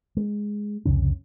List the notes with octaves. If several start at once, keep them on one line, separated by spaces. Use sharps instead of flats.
G#3
C2 F2 C#3 C#4